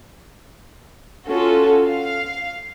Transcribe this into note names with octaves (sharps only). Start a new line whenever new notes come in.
C#4 F4 F#4 A4
F5